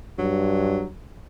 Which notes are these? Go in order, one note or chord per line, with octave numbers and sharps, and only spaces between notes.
G2 F#3